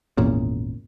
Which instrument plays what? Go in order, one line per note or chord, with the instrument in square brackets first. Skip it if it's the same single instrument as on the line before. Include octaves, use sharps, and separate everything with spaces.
[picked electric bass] G#1 E2 A#2 C#3